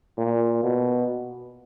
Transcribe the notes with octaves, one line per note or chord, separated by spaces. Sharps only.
A#2
B2